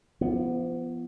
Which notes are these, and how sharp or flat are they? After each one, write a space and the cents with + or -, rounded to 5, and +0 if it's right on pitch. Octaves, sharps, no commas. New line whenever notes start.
F3 -35 B3 +0